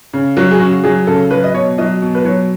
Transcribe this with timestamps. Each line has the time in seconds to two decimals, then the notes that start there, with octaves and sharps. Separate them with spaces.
0.13 C#3
0.37 F#3 F#4
0.51 G#4
0.60 C#3 F#4
0.84 F#3 G#4
1.07 C#3 A4
1.31 F#3 B4
1.44 D#5
1.54 B2 C#5
1.78 F#3 D#5
2.02 B2
2.15 B4
2.25 F#3 C#5